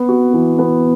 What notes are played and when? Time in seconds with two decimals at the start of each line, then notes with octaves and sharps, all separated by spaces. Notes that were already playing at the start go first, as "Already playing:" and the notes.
Already playing: B3
0.09 F#4
0.33 E3
0.59 B3